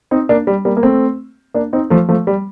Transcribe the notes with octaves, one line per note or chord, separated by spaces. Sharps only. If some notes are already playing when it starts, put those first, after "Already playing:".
C4 D#4
A#3 D4
G3
G3 A#3
A#3
A3 C4
A#3 D4
C4 D#4
F3 A3
F3 A3
G3